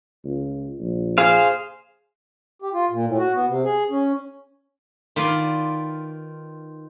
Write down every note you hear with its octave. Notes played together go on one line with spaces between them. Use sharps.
C#2
A#1
G#4 C5 F5
G4
F4
A#2
A2
F#4
B3
C3
G#4
C#4
D#3 F4 B4 D5 C6